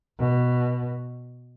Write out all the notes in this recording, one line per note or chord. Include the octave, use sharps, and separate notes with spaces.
B2